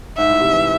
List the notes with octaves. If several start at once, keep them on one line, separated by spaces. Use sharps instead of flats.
G#2 E5
A2
C3
E3